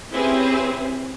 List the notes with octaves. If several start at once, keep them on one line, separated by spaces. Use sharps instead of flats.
C4 C#4 E4 G4 G#4 B4